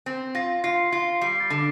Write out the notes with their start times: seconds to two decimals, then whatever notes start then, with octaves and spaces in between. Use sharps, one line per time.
0.06 C4
0.35 F4 A#6
0.64 F4 C7
0.92 F4
1.21 G3 C7
1.40 A6
1.50 D3